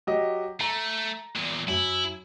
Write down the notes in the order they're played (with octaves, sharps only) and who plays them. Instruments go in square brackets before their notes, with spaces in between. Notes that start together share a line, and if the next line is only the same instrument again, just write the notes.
[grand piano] F#3 G4 D#5
[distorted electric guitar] A3 [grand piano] A#5
[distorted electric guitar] E2 A#2
[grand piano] F#2 [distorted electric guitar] E4